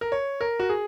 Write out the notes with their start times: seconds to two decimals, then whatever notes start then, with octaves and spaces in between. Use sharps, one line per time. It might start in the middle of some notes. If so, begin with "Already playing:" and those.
0.01 A#4
0.12 C#5
0.41 A#4
0.60 F#4
0.69 G#4